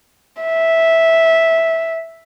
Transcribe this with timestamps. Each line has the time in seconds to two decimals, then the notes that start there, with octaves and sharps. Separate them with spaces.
0.42 E5